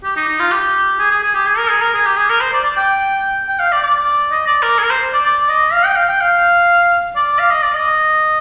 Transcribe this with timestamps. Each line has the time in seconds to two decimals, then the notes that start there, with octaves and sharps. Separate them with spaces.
0.04 G4
0.16 D#4
0.28 D#4
0.40 F4
0.52 G4
0.99 G#4
1.11 G#4
1.23 G#4
1.35 G4
1.46 G#4
1.58 A#4
1.70 G#4
1.81 A#4
1.94 G#4
2.06 G4
2.17 G#4
2.30 A#4
2.41 C5
2.53 D5
2.64 D5
2.77 G5
3.48 G5
3.60 F5
3.72 D5
3.83 D5
4.31 D#5
4.47 D5
4.63 A#4
4.79 G#4
4.84 A#4
4.91 C5
5.14 D5
5.26 D5
5.49 D#5
5.73 F5
5.85 G5
5.96 F5
6.09 G5
6.21 F5
7.16 D5
7.39 F5
7.51 D#5
7.62 D5
7.74 D#5